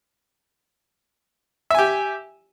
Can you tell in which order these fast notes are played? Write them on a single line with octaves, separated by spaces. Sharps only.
E5 G#5 G4